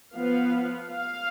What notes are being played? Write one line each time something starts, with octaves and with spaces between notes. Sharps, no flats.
F3 B3 F5
F5